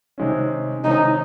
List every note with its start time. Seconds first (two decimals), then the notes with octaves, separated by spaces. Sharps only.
0.18 C3 D#3 G#3 C#4
0.84 C3 D#3 G#3 C#4 D#4